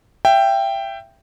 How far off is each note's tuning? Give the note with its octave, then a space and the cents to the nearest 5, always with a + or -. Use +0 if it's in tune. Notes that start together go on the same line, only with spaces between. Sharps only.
E5 +25 G5 +0